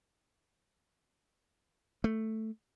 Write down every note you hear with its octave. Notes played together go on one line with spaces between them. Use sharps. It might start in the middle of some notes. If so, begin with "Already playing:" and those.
A3